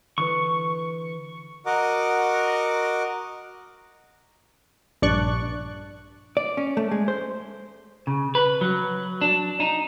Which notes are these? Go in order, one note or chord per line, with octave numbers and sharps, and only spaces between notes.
D3 E3 B4 C#6
F#4 A#4 D#5 F#5 D6
A#1 G2 D4 D5 C#6 F#6
D5
C#4
A3
G#3
C5
C#3
B4
F#3
D4
D#4